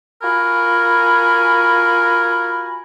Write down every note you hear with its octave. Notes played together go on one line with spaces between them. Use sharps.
F4 F#4 A#4 G#5 B5